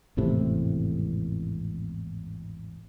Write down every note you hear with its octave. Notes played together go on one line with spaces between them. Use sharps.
G#1 E2 A2 C3